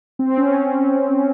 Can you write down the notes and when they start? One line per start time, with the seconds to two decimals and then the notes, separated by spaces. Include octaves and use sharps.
0.19 C4
0.38 C#4